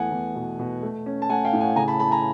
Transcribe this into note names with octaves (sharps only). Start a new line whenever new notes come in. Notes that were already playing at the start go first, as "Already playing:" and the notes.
Already playing: E2 A3 F#5 G#5
E2
B2
B2
A3
C#4
A5
A3 F#5 G#5
F5 G5
A2
F#5 G#5
C#3 G#5 A#5
A5 B5
A3 A5 B5
G#5 A#5